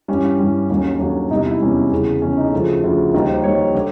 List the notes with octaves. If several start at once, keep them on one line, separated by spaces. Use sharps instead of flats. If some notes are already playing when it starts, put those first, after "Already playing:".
G2 E3 G3 C#4
G2 E3 G3
D#2 D3 F#3 C#4
D#2 D3 F#3
E2 C3 E3 G3 D#4
E4
E2 C3 E3 G3 C#4
E2 C#3 E3
E2 C#3 E3 C#4
D#4
D2 C#3 F3 A4
D2 C#3 F3
D#2 D#3 G3 A#4
C5
D#2 D#3 G3 C#5
D3